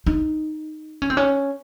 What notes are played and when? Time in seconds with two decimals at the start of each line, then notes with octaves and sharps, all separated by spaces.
0.06 D#4
1.02 C#4
1.10 C4
1.17 C#4